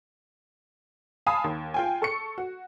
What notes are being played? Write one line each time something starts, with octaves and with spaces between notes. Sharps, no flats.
F5 G#5 A5 B5 D#6
D#2
F4 G5 G#5
A4 C#6 C#7
F#4